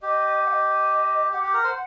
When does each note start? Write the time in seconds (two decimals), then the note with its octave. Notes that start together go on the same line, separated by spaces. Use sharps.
0.02 G4 D#5
0.46 F#5
0.49 D#5
1.32 G4 F#5
1.43 G4
1.54 A#4
1.64 C5